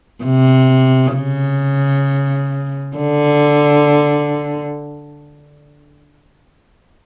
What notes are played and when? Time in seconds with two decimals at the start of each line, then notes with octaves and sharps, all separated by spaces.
0.24 C3
1.14 C#3
2.97 D3